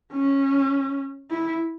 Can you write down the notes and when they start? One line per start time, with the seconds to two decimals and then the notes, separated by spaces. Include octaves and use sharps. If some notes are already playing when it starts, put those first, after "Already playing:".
0.13 C#4
1.31 E4